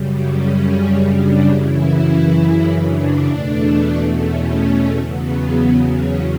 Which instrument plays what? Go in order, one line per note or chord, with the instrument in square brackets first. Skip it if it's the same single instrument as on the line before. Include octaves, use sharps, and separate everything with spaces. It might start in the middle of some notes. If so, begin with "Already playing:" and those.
Already playing: [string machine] F#2 C#3 G3
C#4
D4
F#2 C#3 E3 E4
D4
E2 B2 A3
C#4
E2 C#3 F#3 B3
C#4